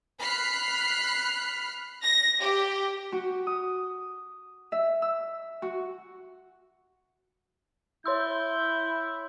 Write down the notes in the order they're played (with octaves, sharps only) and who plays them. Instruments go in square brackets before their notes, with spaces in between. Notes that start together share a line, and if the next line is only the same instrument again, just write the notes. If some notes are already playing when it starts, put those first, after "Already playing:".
[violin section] B5 F6 F#6 B6 C7
A#6
G4
[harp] F#4
D#6
E5
E6
F#4
[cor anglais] E4 [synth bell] C#5 C6 E6 [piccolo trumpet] G6